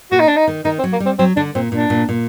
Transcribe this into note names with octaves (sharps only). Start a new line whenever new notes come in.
A#2 F#4
D#4
D4
D#4
D#3
D#3 D#4
C4
F#3
A#3
G3
C4
F#3 C4
D3 D4
A#2 C4
A#2 D4
A#2
A#2